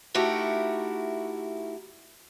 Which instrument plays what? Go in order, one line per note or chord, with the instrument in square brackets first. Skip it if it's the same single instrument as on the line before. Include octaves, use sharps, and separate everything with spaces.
[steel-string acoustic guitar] A3 D#4 E4 F#4 G4 A#4